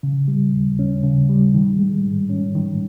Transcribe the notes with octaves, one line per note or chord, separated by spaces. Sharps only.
C#3
G3
D#2
C#4
C#3
G3
D#3
G#3
G#2
C#4
D#3